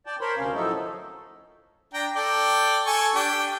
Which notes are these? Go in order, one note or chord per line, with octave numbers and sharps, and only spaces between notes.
D5 G5 A5
A#4 C5 C#5 B5 C6
D2 C3 C#4 F5
A2 F3 F#3 A3 D#4 A4
D4 G5 A#5
A4 D5 G5
A4 G#5 C#6
D4 G4 G5